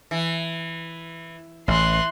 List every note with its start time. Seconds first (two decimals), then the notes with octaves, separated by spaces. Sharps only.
0.11 E3
1.68 A1 E3 C6 F#6